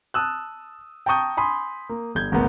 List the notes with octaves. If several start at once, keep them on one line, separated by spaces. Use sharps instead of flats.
A5 D#6 E6 F#6
G5 A5 A#5 C#6 D#6 G6
G#5 B5 C6 D#6
A#3
G1 G6 G#6
G#1 C#2 A#3 B3